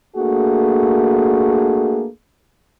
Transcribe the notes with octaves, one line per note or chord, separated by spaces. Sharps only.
A3 A#3 D4 F#4 G#4